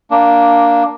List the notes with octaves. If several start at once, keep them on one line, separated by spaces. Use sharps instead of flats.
A#3 D4